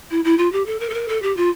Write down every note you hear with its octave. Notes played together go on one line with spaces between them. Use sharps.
E4
E4
F4
G4
A4
A#4
A4
A#4
A4
G4
F4